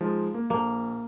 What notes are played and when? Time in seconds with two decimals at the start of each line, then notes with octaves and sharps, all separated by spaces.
0.01 F3 G#3 D#4
0.34 A#3
0.50 A#1 A#3